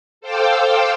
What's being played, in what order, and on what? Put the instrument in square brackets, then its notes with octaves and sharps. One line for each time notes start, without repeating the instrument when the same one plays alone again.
[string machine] A4 C5 F5 G5 D6 E6